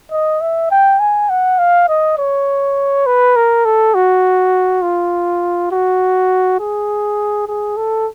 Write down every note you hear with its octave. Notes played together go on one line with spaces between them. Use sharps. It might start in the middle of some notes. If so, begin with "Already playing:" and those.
D#5
E5
G5
G#5
F#5
F5
D#5
C#5
B4
A#4
A4
F#4
F4
F#4
G#4
G#4
A4